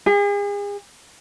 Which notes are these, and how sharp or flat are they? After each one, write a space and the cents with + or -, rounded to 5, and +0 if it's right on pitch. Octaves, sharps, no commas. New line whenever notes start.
G#4 -40